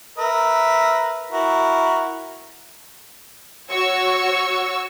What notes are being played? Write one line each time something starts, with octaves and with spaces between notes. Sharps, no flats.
A#4 B4 E5
E4 F#4 A#4
F#4 C#5 C#6 E6